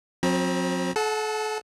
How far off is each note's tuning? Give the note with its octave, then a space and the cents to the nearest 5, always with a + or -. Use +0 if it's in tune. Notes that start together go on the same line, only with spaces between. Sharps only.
F#3 -45 C4 +15 A#5 +45
A4 -35 F#5 -10 A5 +0